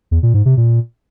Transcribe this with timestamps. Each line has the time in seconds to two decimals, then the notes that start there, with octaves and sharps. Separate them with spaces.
0.11 E2
0.23 A#2
0.34 G#2
0.46 C3
0.57 A#2